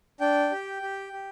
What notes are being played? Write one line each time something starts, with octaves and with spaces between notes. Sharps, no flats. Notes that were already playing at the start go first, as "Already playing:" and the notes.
D4 G5
G4
G4
G4